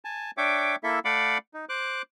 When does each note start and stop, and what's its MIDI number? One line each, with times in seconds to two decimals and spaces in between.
0.05 0.31 80
0.05 0.31 81
0.37 0.76 62
0.37 0.76 73
0.37 0.76 76
0.37 0.76 79
0.37 0.76 86
0.83 0.99 58
0.83 0.99 64
0.83 0.99 69
0.83 0.99 76
1.05 1.38 57
1.05 1.38 74
1.05 1.38 77
1.05 1.38 78
1.05 1.38 83
1.05 1.38 86
1.54 1.65 63
1.69 2.02 72
1.69 2.02 86
1.69 2.02 90